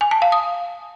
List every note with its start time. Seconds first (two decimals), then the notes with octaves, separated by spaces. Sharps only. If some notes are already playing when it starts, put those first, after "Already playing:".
0.01 G#5
0.11 A5
0.22 F5
0.32 D#6